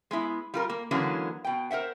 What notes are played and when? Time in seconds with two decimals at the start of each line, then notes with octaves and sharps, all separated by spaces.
0.11 G#3 B3 E4
0.54 G3 F4 A#4
0.69 A#3
0.91 D3 E3 F#3 G#3 A#3 C#4
1.45 B2 G5
1.71 A#4 C5 E5 F#5